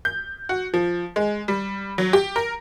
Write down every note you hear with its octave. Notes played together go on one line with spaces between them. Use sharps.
G6
F#4
F3
G#3
G3
F#3
G4
A#4